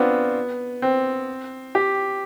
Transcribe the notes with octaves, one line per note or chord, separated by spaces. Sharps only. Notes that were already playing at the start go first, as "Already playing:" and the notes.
Already playing: B3 C4 D4 F4
C4
G4